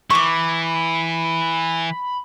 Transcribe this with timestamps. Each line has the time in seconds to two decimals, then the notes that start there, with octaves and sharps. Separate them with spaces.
0.10 E3 B5 C#6 D6